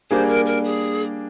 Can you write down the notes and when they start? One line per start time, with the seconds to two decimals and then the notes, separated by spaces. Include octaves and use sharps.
0.11 G3 A#3 D4 G#4 C5
0.28 A#4
0.46 A#4
0.64 G#4